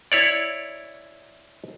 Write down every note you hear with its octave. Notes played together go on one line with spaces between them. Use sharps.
E4 C#5 D5